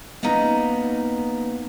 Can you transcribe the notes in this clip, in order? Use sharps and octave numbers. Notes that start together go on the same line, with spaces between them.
A#3 B3 C#4 D#4 A#5